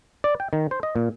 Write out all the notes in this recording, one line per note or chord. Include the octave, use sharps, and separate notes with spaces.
D5
G5
D#3
C5
D#5
A#2